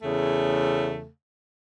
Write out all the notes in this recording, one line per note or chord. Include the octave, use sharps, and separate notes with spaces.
E2 C#3 A3